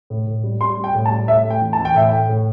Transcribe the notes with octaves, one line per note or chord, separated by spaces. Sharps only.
A2
A2
G3
G3 C6
G3
G5
A2
A5
G3
A2 E5
A3
G5
E3
A5
E3
G5
A2 E5
A3 G5
A2